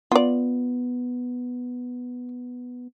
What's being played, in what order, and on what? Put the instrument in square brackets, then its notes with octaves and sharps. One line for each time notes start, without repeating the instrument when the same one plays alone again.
[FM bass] B3 [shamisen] F4 D5